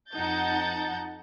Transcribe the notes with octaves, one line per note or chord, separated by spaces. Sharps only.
F2 D#4 F#5 A5 G6 A6